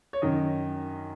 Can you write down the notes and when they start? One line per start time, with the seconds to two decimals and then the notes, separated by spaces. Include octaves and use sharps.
0.13 C#5
0.22 F#2 D#3 D#5